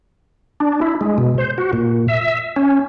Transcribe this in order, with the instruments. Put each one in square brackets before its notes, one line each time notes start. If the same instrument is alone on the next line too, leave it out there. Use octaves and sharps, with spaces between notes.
[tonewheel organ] D4
E4
G#3
B2
C5
F#4
A#2
E5
C#4